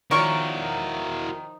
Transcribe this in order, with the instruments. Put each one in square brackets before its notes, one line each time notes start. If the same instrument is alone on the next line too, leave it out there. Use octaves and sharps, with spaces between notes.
[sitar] D#3 [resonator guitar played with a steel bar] F3 C#5 [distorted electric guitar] E4 F#4 [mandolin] A#4 D5 C#6